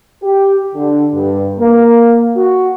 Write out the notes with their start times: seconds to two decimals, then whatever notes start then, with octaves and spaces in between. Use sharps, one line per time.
0.23 G4
0.75 D3
1.14 G2
1.59 A#3
2.35 F#4